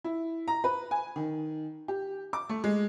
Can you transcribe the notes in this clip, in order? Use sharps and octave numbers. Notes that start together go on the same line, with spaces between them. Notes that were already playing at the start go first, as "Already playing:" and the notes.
E4
A#5
B4
G#5
D#3
G4
D6
A3
G#3